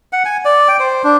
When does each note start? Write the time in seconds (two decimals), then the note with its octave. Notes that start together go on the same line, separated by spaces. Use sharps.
0.13 F#5
0.25 G#5
0.45 D5
0.68 G5
0.80 C5
1.04 D4